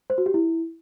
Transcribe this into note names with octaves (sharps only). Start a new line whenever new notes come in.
C5
F#4
G4
E4